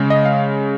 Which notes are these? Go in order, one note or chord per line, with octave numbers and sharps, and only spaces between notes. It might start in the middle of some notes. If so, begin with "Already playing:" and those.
Already playing: C#3 G#3
D#5
F5